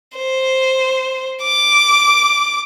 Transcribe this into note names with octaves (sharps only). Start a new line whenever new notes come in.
C5
D6